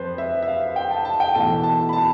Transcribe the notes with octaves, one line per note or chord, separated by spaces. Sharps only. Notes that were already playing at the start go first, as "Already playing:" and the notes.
Already playing: F2 B4 C5
E5
E5
F5
G5
A5
A5
G5
E2 B2 A3 A5
A5
B5
A5